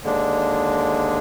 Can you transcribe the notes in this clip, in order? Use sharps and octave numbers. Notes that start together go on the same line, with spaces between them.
D#2 D3 G#3 D4